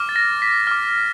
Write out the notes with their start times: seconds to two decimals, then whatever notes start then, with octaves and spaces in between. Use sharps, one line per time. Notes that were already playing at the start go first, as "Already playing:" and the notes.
Already playing: D6 F6
0.09 A6
0.16 A#6
0.42 B6
0.67 D6 F6